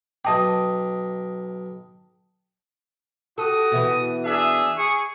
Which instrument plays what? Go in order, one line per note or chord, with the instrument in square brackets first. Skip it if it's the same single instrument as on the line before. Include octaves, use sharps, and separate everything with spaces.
[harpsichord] B1 D#5 D6 [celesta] G5 A5 D#6
[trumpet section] F#4 G4 D#6 [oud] A4
[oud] B2 E3
[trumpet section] D4 G#4 E5
G#4 C#6